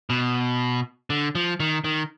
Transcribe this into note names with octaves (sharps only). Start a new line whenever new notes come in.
B2
D3
F3
D#3
D#3